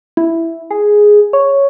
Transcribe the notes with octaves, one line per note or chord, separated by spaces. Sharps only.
E4
G#4
C#5